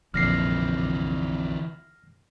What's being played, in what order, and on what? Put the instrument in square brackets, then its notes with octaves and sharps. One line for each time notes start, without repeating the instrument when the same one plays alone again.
[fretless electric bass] A#1 [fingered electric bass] F2 [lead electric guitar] D3 E3 [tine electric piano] F6 A#6 C7